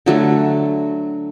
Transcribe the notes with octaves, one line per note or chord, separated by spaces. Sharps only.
D3 F#3 A3